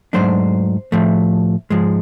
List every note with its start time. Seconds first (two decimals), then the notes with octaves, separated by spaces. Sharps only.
0.13 G#2 D#3 F#3 A3 D4 C5
0.92 A2 F3 A3
1.70 G#2 F3 G#3